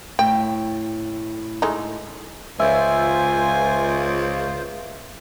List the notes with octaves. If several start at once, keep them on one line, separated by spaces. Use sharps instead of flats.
A2 G5
G#3 A3 D#4
C#2 F4 C5 E5 G#5